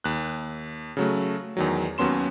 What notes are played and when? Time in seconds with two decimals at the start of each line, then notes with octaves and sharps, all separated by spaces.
0.04 D#2 F#6
0.97 C#3 F#3 A3
1.57 E2 D#3 F#3
1.98 D#2 F#3 B3 C#4 C6 E7